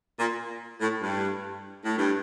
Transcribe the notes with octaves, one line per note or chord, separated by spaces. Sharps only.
A#2
A2
G2
A2
G2